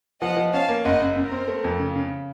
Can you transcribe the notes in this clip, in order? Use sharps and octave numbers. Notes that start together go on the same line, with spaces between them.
F3 D#5 F#5
F3
C#4 F5 A5
A#3
F#1 D#5 F#5
F#2
F#2 A#4
C4
A3
F2
C#3
C#3